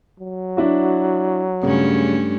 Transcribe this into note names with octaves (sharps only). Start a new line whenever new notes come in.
F#3
D4 E4 F#4
G2 C#3 A3 C#4